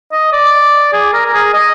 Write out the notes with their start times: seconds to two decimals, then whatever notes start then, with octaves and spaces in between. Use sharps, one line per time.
0.12 D#5
0.32 D5
0.93 G#4
1.13 A#4
1.25 A#4
1.34 G#4
1.54 D#5